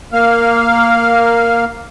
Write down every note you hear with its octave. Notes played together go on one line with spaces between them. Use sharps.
A#3 F5